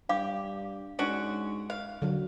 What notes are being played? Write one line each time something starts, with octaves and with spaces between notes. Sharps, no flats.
G2 G4 F5 D6
G#2 C#4 D4 F#4
F5
D3 F#3